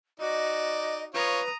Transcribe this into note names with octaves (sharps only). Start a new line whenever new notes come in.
D#4 F#4 D5 D#5
F4 B4 C#5 A#5 D#6